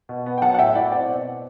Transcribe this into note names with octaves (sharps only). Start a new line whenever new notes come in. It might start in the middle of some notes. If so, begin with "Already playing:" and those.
B2
B3
G5
F#3 F#5 A5
F#5
A2 E5 G5
E4 D5 F#5
C4 D5 F#5
B2